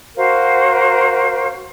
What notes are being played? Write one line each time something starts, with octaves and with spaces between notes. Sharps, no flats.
F#4 A#4 C5 F5